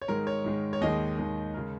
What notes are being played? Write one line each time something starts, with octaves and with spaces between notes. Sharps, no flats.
C#5
G#2 D#3 G#3 A#4
C#5
G#2 D#3 G#3
C#5
D#2 D#3 G#3 D#5
D#2 D#3 G#3
C#3 G#3 A#4